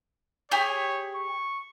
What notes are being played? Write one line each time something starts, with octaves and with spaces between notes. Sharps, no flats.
G4 G#4 C#5
C#6